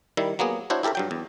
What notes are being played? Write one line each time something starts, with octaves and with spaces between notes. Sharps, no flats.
D#3 G3 E4
F#3 A#3 B3 G#4
D4 E4 F#4 C5 C#5
E4 G4 A4 A#4 E5
G2 F#3 G5
E2